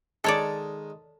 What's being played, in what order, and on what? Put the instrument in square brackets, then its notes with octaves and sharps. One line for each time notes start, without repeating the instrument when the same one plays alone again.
[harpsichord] D#3 G#3 [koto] A4 C#5 D5